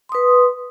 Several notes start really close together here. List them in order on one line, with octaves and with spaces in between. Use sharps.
C6 D#6 B4